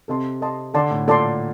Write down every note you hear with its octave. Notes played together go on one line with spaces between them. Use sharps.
C3 A4 D#5 A5 C6
A4 D#5 A5 C6
D3 A4 D5 A5 C6
A2
A#2 A4 D5 A5 C6